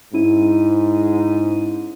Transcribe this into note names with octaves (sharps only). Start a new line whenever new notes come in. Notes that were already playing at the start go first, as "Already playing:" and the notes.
G#2 C#4 E4 D#7